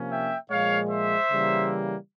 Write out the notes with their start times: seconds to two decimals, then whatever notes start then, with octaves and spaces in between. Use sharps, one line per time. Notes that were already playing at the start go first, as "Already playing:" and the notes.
Already playing: C3 F3 A#3 C#4
0.09 E5 G5
0.50 A#2 F3 G#3 C#5 F5
0.91 C5 E5
1.31 C#3 E3 G3 A#3